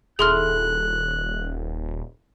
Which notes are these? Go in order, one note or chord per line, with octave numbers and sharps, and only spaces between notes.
D#1 E4 G#4 A4 C6 F6 F#6